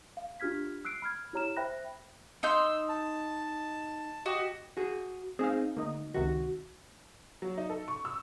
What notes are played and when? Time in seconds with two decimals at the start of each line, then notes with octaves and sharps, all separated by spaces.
0.17 F5
0.40 D4 F4 G4 F6 G#6 B6
0.85 E6 F#6 C7 D7
1.02 B5 F6 G#6
1.33 E4 G4 C#5 A#5 F6 E7
1.57 C5 E5 G5 B5 F#6 A#6
2.43 D#4 C6 E6 G6
2.89 A5
4.26 F#4 G4 D#5
4.77 F#4 G#4
5.39 C4 D#4 G#4 F5
5.77 D2 A#3 D#4 D#5
6.14 C#2 C3 D#3 F#4
7.42 F#3
7.57 D#4
7.70 A4
7.88 C#6
8.05 E6